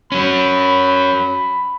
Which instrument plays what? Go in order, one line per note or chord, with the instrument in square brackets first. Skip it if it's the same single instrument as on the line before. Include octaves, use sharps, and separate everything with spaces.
[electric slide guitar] F#3 C#4 [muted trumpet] B5